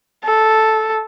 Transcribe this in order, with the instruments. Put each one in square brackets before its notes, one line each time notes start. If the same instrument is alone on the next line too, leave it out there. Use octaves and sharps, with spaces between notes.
[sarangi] A4